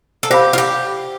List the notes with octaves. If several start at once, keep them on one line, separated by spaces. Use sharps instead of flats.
A4
G4 C5 F5 B5
F4
G4